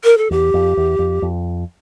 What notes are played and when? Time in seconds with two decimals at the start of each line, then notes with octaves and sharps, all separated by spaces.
0.04 A#4
0.18 A4
0.31 E2 G4
0.54 F2
0.77 E2
0.99 F2
1.22 F2